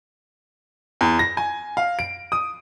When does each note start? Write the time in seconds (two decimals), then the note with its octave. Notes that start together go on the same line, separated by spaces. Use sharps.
1.01 E2
1.19 A#6
1.37 G#5
1.77 F5
1.99 D7
2.32 D#6